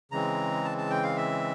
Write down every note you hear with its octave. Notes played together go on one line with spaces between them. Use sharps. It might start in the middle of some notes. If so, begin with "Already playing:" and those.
C#3 E3 G#3 C4 A#5
A5
A5
G5
F5
E5